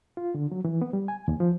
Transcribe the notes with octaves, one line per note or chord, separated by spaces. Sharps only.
F4
D3
F#3
E3
B3
G3
G#5
D#2
F3